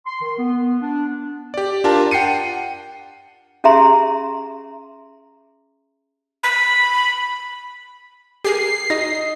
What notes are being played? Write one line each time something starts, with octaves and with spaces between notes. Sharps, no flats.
C6
D#3
B3
D4
G4 D5
D4 F4 G4 A#4 A5
F#5 G5 C7 C#7 D#7
C#4 G4 G#4 E5 A#5 C6
B5
G4 G#4 A#4 C7
D#4 F#4 D#5 A#6